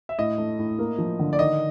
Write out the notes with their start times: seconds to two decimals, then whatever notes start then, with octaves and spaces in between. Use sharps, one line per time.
0.09 E5
0.19 A2 D#5
0.38 A3
0.59 A2
0.79 A#3
0.98 F3
1.19 D3
1.33 D5
1.39 D#3 D#5